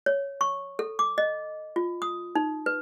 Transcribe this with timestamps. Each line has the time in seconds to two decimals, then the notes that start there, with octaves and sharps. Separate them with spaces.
0.06 C#5
0.41 C#6
0.79 A4
0.99 D6
1.18 D#5
1.76 F4
2.02 D#6
2.35 D#4
2.66 B4